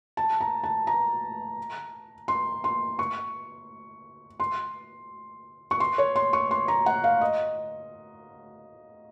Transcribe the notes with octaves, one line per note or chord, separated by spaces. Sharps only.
A5
A#5
A5
A#5
C6
C6
C#6
C6
C#6
C6
C#5
C6
C#6
C6
A#5
F#5
F5
D#5